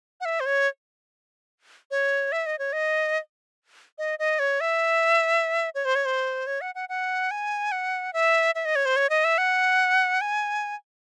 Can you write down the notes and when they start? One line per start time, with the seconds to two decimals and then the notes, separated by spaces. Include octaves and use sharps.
0.21 F#5
0.25 E5
0.40 C5
0.46 C#5
1.91 C#5
2.32 E5
2.46 D#5
2.59 C#5
2.73 D#5
3.98 D#5
4.19 D#5
4.39 C#5
4.61 E5
5.75 C#5
5.85 C5
5.95 C#5
6.05 C5
6.47 C#5
6.61 F#5
6.75 F#5
6.89 F#5
7.31 G#5
7.72 F#5
8.13 E5
8.55 E5
8.65 D#5
8.76 C#5
8.86 C5
8.96 C#5
9.10 D#5
9.24 E5
9.38 F#5
10.21 G#5